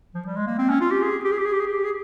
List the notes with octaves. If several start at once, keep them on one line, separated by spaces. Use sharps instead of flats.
F3
G3
G#3
A#3
C4
C#4
F4
G4
G#4
G4
G#4
G4
G#4
G4
G#4
G4
G#4